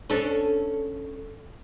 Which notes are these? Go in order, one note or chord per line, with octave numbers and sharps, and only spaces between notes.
C#4 D4 A4